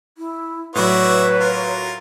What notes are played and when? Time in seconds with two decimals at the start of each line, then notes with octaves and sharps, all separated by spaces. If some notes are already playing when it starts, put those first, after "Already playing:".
0.18 E4
0.75 A2 F#3 F#4 B4 C#5 D5 E5
1.40 F4 A#4